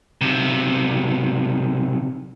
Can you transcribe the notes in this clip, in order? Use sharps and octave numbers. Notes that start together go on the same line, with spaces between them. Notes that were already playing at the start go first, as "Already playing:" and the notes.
B1 C3